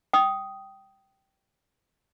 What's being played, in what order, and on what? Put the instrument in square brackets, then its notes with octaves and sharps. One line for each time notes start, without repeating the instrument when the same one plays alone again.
[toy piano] G5 D#6